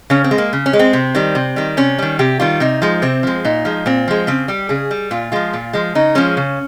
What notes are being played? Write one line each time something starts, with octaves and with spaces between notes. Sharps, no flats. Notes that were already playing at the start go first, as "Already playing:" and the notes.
C#3 C#4
C4
G#3
A#3
C#3
C#4
G#3
C4
C3
D#3 G3
C3
D#3 G3
C3 C#4
D#3 G3
C3 G4
D#3 G3 F4
C3 D#4
F3 G#3
C3 C4
F3 G#3
A#2 D#4
F3 G#3
A#2 C4
F3 G#3
C#3 C4
G3 G4
C#3 G#4
G3
A#2 F4
F3 G#3 F4
A#2
F3 G#3
C#3 D#4
F3 G#3 C#4
C#3